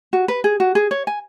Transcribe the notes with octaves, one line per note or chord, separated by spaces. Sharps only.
F#4
B4
G#4
F#4
G#4
C#5
G#5